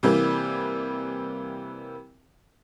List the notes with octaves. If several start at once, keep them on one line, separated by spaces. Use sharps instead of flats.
C3 E3 G3 A#3